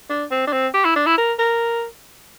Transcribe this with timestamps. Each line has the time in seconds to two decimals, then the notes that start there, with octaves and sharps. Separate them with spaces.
0.09 D4
0.31 C4
0.47 D4
0.53 C4
0.74 G4
0.85 E4
0.96 D4
1.06 E4
1.18 A#4
1.39 A#4